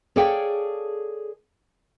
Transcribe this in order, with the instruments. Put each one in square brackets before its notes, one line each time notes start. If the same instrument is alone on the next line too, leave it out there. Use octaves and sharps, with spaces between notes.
[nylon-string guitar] G#4 A4 C#5 D5 F5 G5